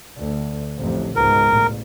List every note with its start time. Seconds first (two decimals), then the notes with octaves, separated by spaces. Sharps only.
0.18 D2
0.79 A1 F2 C3
1.16 C#2 G#2 B2 A#4
1.49 A1